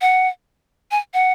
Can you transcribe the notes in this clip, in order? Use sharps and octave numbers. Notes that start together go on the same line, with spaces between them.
F#5
G#5
F#5